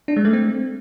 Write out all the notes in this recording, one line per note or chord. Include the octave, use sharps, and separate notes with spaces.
D4
G#3
A3
C4